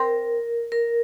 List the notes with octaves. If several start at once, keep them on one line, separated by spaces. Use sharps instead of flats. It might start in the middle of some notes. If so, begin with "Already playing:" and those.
Already playing: C4 A#4
A#4